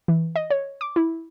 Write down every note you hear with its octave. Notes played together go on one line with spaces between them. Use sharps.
E3
D#5
C#5
D6
E4